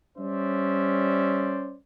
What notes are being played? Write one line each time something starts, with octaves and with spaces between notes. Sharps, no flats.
G3 C#4 C5 D5 E5